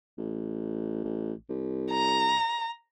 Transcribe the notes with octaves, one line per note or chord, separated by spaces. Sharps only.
A1
A1
C2
A#5